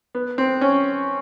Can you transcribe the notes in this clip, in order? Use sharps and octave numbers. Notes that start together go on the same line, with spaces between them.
B3
C4
C#4